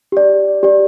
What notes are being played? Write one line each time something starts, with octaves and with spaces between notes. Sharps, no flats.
G4 D5
G4 D5